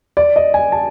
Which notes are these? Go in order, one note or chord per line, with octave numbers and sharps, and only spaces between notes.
D5
D#5
G#5
A5